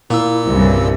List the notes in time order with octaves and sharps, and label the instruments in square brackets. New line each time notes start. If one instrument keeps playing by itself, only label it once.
[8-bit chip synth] A#2 E6 [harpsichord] A#3 [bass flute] E4
[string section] C2 G2 [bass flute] C#3